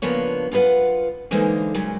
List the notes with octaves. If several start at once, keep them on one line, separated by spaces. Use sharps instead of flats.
C#3 F3 A#3 B3 D4 C#5
F#2 F4 A#4 B4 F#5
D3 E3 G#3 A#3 D#4 C5
A#2 C#3 F#3 G#3